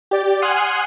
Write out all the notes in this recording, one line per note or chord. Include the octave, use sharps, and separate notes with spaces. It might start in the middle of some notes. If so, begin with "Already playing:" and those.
G4 D5
F#5 G#5 C6 D#6 F6 F#6